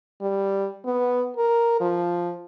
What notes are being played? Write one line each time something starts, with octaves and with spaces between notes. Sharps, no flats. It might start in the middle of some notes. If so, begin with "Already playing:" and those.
G3
B3
A#4
F3